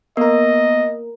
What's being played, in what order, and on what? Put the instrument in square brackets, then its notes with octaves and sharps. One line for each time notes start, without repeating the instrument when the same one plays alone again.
[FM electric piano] A#3 A#4 [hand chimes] B3 [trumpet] D#5